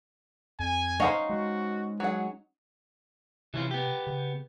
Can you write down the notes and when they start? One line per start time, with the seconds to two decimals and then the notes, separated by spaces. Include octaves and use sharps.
0.59 F2 G#5
1.00 C#4 D#4 C5 D#5 F5 F#5
1.30 G#3 F#4
2.00 F#3 G#4 F#5
3.54 C3 E3 C#4 F4
3.71 B3 G4
4.07 C#3